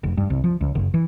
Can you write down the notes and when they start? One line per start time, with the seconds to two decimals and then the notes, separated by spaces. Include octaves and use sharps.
0.03 F1
0.17 G2
0.30 C2
0.44 F3
0.61 C#2
0.75 F#1
0.94 E3